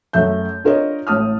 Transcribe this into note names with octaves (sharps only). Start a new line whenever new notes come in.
F#2 A3 E5 G6
D4 F4 A#4 C#5 D#5
A1 A2 A5 D#6 F6